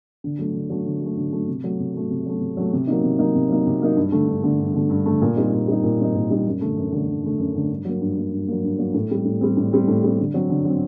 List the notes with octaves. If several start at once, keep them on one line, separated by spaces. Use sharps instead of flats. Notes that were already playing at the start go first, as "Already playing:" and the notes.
D3
F#3 A3
D3
F#3 A3
D3
F#3
A3
D3
F#3 A3
C3
F#3 A3
C3
F#3 A3
C3
F#3 A3
C3
F#3 A3
C3
F#3 A#3 D#4
C3
F#3 A#3 D#4
C3
F#3 A#3 D#4
C3
F#3 A#3 D#4
G2
D3 A3
G2
D3 A3
G2
D3 A3
G2
D3 A3
A#2
G3 C4 D#4
A#2
G3 C4 D#4
A#2
G3 C4 D#4
A#2
G3 C4 D#4
F#2
D3 A3
F#2
D3 A3
F#2
D3 A3
F#2
D3 A3
G2
F#3 A#3
G2
F#3 A#3
G2
F#3 A#3
G2
F#3 A#3
A2
G3 C4
A2
G3 C4
A2
G3 C4
A2
G3 C4
D3
F#3 C4
D3
F#3 C4